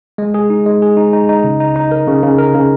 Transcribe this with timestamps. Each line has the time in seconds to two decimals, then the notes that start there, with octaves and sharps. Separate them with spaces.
0.18 G#3
0.34 G#4
0.50 D#4
0.66 G#3
0.82 G#4
0.97 D#4
1.13 D#4
1.29 D#4
1.44 C#3
1.60 D#4
1.76 D#4
1.92 A#4
2.07 C#3
2.23 C#3
2.38 A#4
2.55 C#3